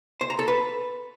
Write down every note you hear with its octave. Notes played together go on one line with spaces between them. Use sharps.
C5
A#5
A4
B4